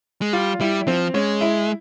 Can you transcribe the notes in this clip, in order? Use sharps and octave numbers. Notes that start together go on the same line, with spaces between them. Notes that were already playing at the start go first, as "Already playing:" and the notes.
G#3
G3 F4
G3 E4
F3 C4
G#3 C#4
E4